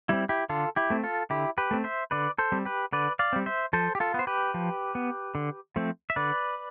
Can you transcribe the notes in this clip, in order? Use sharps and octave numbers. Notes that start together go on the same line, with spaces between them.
G3 C4 E4
E4 G4
D3 F4 A4
E4 G4
A3 C4
F4 A4
D3 E4 G4
G4 B4
A3 C4
C5 E5
D3 B4 D5
A4 C5
G3 C4
G4 B4
D3 B4 D5
D5 F5
G3 C4
C5 E5
F3 A4 C5
G4
F4 A4
B3 C5
G4 B4
F3
B3
D3
F3 A3 C4
E5
D3 B4 D5